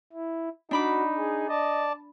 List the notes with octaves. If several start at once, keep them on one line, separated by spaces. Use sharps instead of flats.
E4
D4 D#4 F#4 B5 D6
G#4
D5 D#5 A5